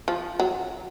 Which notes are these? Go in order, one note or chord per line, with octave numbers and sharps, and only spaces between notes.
F3
F#3